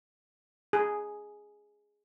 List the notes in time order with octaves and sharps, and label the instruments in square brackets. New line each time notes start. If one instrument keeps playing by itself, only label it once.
[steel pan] G#4